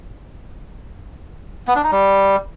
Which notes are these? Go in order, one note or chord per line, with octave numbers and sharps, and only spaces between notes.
B3
D4
D#4
G3